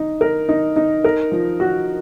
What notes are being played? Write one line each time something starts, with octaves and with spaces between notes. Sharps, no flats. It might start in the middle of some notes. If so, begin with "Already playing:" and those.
Already playing: D#4
A#4
D#4
D#4
A#4
F3
F#4